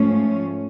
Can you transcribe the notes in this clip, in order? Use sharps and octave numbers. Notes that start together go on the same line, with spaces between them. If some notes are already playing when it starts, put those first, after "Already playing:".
Already playing: G#2 F3 A3 C#4